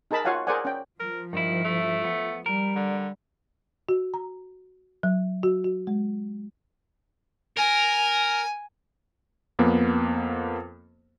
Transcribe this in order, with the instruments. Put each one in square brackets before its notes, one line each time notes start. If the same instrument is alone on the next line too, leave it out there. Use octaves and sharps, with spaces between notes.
[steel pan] D#4 G#4 A#4 A5 B5
F4 F#4 C#5 F5 F#5 G#5
G#4 A#4 C5 D5 F#5 G#5
C#4 G5
[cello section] F3 [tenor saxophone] A#4
[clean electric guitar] G2 E4 [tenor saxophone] D#3
[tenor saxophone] A3
[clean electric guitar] B3
[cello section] G3 [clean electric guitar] A#4
[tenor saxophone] D3
[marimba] F#4
A#5
F#3
F#4
F#4
G#3
[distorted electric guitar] A#4 [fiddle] G#5
[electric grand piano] F2 A#3 B3